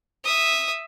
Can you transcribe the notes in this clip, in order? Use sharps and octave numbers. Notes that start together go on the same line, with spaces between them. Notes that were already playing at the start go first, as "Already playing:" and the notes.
E5 D#6